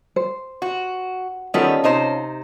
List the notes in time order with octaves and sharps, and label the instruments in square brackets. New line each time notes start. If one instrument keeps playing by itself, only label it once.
[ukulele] C5
[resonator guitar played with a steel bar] F#4
[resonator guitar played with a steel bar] D#3 G3 B3 [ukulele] C#4 F4 A4
[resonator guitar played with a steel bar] C3 D#4 C5